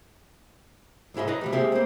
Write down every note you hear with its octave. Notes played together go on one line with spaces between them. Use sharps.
C2 G#2 E4 G#4 D#5
B4 C#5 D#5 A#5
C3 F3 G3
G#3 A#3 C4 G4 G#4 E5
A#3 C5